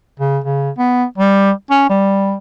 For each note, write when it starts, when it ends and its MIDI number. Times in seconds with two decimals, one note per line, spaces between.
0.20 0.39 49
0.44 0.70 49
0.78 1.04 59
1.18 1.51 55
1.71 1.85 61
1.90 2.35 55